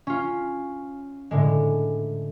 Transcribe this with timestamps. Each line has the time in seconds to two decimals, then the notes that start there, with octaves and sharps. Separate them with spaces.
0.07 C#4 F4
1.31 A2 D3 G#3